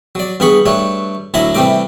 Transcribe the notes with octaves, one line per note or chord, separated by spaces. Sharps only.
F#3 D5
G2 B3 G#4 B5 C#6
G2 A3 D4 C#5
D2 F#3 E4 E5 G#5 A#5
C3 E3 G3 A3 D6